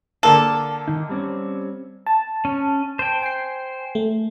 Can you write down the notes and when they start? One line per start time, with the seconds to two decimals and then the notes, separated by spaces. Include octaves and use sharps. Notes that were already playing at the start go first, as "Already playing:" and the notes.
0.23 D3 A#3 A4 A#4
0.88 D#3 D#4
1.09 G3 C4 C#4
2.07 A5
2.45 C#4
2.99 C5 G5
3.22 G#5 C7
3.95 A3